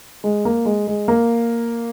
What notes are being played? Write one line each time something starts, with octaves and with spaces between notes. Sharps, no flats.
G#3
A#3
G#3
G#3
A#3